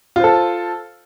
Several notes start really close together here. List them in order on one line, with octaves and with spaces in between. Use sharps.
F4 C5 A4